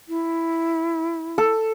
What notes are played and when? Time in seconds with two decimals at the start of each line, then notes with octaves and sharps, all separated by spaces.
0.09 E4
1.38 A4